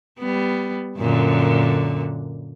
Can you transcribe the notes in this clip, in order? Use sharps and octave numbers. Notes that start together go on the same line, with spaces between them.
G3 B3
F#2 A#2 D3